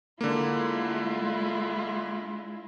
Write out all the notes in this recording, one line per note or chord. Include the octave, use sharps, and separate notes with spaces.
D3 G#3 A#3 E4 F4